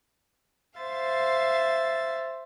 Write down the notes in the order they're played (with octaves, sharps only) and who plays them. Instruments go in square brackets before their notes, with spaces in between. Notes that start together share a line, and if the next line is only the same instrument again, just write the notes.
[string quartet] C5 E5 F5 A6